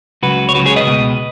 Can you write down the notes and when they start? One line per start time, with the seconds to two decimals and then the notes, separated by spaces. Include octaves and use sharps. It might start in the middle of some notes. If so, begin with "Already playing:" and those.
0.22 C#2 C#3 F#3 F#4 B4
0.49 C#5
0.54 C#2 C#3 F#3 F#4 B4
0.66 G#4 C#5
0.76 B4 D#5
0.87 C#2 B2 G#3